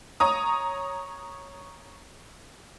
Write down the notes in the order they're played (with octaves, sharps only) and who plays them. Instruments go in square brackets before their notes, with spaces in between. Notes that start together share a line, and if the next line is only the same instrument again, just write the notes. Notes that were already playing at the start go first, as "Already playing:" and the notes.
[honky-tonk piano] C#5 A#5 D#6